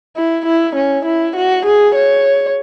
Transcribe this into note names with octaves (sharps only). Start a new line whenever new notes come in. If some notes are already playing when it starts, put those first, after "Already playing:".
E4
E4
C#4
E4
F#4
G#4
C#5